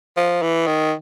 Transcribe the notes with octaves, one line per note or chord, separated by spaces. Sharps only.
F3
E3
D#3